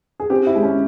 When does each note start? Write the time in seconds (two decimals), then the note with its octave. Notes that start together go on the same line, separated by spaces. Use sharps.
0.20 G#4
0.30 C4 G4
0.47 E4
0.55 G#3
0.63 C#4